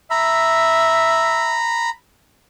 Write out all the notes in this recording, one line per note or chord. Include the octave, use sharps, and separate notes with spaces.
E5 A#5 B5